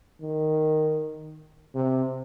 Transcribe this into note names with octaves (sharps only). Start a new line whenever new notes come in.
D#3
C3